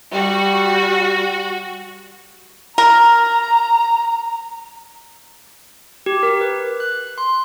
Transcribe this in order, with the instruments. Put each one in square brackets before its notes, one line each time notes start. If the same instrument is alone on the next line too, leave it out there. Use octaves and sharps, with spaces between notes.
[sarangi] G3 [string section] F#4
[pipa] A#4 [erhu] A#5
[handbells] G4
A#4
B4
F#6
C6